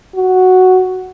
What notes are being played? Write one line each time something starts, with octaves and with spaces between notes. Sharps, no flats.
F#4